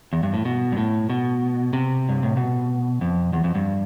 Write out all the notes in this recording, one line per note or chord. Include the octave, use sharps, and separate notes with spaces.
E2
G2
A2
B2
G2
A2
B2
C3
G2
A2
B2
F2
E2
F2
G2